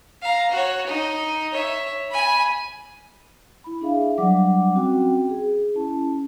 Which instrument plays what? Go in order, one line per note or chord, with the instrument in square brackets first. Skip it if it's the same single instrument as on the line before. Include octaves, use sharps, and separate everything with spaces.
[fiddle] F5 A#5
F#4 C#5
D#4
C#5 E5
G#5 B5
[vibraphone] E4 B5
D4 G#4 E5 F5
F#3 G3 D4 D5 F#5 D6
C4 C#4 F#4 G5
G#4
C#4 E4 A5